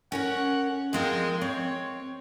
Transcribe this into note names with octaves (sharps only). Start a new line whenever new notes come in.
C#4 A#4 C#5 F#5
F3 G#3 C4 A#4
C4 C#5